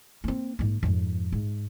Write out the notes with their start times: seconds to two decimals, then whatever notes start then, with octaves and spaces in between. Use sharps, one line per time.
0.24 A#3 C4
0.59 G#2 A#3
0.83 F2 G#2
1.32 G#2